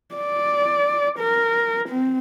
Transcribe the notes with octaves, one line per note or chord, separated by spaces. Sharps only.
D5
A#4
C4